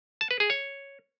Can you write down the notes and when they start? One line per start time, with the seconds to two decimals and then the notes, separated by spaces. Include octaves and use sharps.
0.21 A5
0.31 B4
0.40 G#4
0.50 C#5